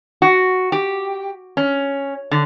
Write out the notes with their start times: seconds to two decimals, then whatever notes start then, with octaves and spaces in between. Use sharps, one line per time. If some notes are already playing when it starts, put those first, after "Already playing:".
0.22 F#4
0.72 G4
1.57 C#4
2.31 D3